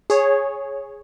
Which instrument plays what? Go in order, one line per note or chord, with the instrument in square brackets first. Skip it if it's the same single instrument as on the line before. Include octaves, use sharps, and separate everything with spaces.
[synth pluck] G#4 C#5